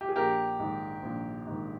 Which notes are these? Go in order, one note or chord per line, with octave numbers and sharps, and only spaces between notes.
G4
G#4
A#1 G4 A#4
G#2 D#3
A#1
G#2 D#3